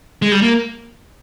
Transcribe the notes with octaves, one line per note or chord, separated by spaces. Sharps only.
G#3
G3
A#3